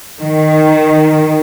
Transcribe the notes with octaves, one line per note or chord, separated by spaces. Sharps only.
D#3